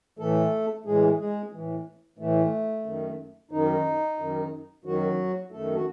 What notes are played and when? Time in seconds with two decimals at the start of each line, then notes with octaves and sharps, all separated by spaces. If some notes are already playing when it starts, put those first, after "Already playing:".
0.19 A2 E3 A3 A4
0.85 A2 E3 G#3 G#4
1.18 G#3 G#4
1.52 A2 E3
2.18 A2 E3 A3
2.85 F#2 D#3
3.51 F#2 D#3 D#4
4.19 F#2 D#3
4.85 F#2 D#3 F#3 F#4
5.51 F#2 D#3 A3 A4
5.74 F#4